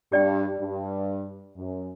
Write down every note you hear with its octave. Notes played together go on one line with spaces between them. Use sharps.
G2 G4 D5 G5
G2
F#2